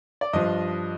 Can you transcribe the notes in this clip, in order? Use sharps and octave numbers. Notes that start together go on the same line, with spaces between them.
D5
G2 F3 D#5